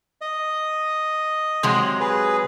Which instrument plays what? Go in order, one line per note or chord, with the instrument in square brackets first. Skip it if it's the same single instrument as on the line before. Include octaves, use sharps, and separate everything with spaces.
[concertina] D#5
[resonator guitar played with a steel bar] C3 F#3 G#3
[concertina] G#4 B4